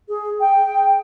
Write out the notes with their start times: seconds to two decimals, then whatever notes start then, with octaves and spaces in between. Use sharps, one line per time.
0.09 G#4
0.40 G5